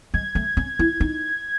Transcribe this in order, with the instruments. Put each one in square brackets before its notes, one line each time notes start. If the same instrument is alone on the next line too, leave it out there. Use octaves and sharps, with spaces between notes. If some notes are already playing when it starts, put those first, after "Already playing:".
[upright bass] G#3 [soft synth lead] G#6
[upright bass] A3
C#4
E4
D#4